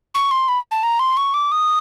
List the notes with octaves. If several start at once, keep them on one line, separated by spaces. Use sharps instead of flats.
C#6
C6
B5
A5
A#5
C6
C#6
D6
D#6